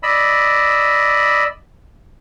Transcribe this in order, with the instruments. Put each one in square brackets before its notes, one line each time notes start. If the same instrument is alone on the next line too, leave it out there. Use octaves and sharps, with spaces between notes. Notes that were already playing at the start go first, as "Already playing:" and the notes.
[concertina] D5 D#5 B5 E6